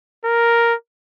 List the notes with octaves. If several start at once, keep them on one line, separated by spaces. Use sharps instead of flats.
A#4